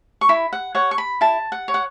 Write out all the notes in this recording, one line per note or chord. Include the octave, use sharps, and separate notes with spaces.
C#6
E4 B5
F#5
C#5 F#5
C#6
B5
E4 A5
F#5
C#5
F#5